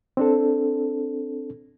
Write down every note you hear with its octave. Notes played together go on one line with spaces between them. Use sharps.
C4 D4 A4